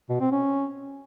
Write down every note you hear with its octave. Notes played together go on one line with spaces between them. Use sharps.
B2
C4
C#4